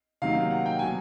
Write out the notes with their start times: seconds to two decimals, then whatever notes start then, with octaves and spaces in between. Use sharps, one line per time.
0.22 C3 D#3 F#3 A#3 F5
0.51 F#5
0.66 G5
0.79 B2 F#3 G#5